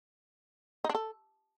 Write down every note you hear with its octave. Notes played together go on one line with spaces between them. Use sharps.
D#4
D4
A4